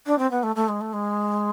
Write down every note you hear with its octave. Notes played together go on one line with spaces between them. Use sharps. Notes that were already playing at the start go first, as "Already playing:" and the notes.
D4
C4
B3
A3
A3
G#3
A3
G#3